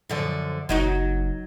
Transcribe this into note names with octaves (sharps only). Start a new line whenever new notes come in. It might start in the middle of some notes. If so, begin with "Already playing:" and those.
F#2 D3 F3
F#1 F#3 D#4 F#4